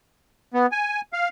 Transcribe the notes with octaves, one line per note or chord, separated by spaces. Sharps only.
B3
G#5
F5